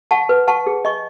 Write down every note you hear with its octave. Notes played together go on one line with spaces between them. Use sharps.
F#5 A5 C#6
B4
F#5 A5 C#6
G#4
D#5 G#5 C#6